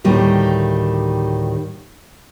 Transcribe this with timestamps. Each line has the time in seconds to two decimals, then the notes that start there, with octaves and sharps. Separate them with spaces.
0.04 D2 A2 D#3 G3 A#3